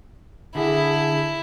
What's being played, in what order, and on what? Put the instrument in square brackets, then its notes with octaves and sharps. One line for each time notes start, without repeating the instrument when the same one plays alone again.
[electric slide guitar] D3 G#4 [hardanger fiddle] E4